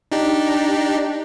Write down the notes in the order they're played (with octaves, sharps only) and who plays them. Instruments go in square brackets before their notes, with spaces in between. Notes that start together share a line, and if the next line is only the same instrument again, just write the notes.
[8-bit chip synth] D4 D#4 G4